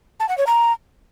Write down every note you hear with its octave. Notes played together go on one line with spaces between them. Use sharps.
A5
F#5
C#5
A#5